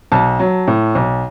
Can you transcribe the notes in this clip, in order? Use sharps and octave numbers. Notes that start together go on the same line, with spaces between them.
B1 A5
F#3
A2
B1